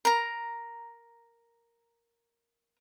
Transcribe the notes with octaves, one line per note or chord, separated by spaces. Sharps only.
A#4 A#5